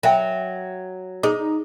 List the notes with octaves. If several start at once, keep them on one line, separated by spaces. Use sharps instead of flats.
F#3 A#4 E5 G5
D#4 G#4 C5 D6